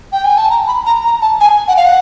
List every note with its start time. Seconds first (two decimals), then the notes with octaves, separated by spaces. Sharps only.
0.12 G5
0.24 G#5
0.37 A5
0.50 A#5
0.67 B5
0.86 A#5
1.05 A#5
1.22 A5
1.41 G#5
1.68 F#5
1.77 F5
1.85 F#5